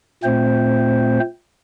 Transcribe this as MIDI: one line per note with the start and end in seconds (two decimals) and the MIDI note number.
0.24 1.19 46
0.24 1.19 57
0.24 1.19 60
0.24 1.19 72